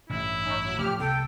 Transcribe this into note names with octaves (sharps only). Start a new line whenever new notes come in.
A1 G2 E4
C#4 D#4
F#3
A2 F3 A3 G4 F6
C2 B3 A4 G5